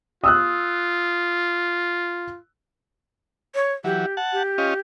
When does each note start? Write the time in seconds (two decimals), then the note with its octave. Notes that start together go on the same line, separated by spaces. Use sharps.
0.24 F4 D#6 E6 F#6
3.55 C#5
3.84 E3 F#3 G4
4.17 F#5 A5
4.32 G4
4.58 C#4 F4 D#5